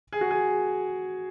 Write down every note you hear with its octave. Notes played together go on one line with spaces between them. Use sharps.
G#4
F#4
G#4